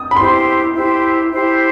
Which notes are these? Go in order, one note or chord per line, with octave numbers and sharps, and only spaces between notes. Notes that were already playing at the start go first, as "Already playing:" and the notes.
Already playing: D#6
B5
E4 G4 C5 C6
E4 G4 C5
E4 G4 C5